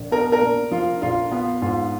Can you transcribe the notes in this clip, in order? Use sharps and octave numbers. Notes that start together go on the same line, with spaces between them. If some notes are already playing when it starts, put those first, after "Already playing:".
Already playing: A#1
B3 A#4
A#4
A#2
F3 F4
A#1 F4
B3 F4
G#2 F4